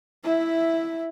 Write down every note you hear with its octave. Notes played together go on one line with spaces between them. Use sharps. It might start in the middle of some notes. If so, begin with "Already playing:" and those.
E4 E5